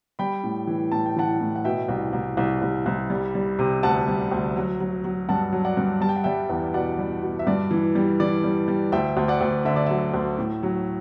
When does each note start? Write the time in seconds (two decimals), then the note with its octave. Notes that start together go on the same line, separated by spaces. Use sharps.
0.19 G3 G5 B5
0.44 A2
0.67 E3
0.92 A2 A5
1.06 G5
1.16 E3 F#5 A5
1.40 A2
1.56 F#5
1.64 B2 E5 G5
1.89 C2
2.13 C2
2.37 C2
2.62 C2
2.86 C2
3.10 G3
3.35 G3
3.59 C3
3.83 D2 F#5 A5
4.08 G3
4.31 D2
4.56 F#3
4.80 F#3
5.04 F#3
5.29 G2 F#5 A5
5.52 F#3
5.65 D5 F#5
5.77 G2
6.01 G3 A5
6.09 G5
6.16 F#5
6.24 G3 E5 G5
6.49 E2
6.74 B2 D5 F#5
6.99 G3
7.22 B2
7.39 E5
7.47 G2 D5
7.71 E3
7.95 G3
8.20 E3 D5
8.44 G3
8.68 G3
8.92 D2 E5 G5
9.17 D2
9.28 D5 F#5
9.41 D2
9.65 D3 E5
9.76 D5
9.86 F#3 E5
10.14 D2
10.39 A2
10.63 F#3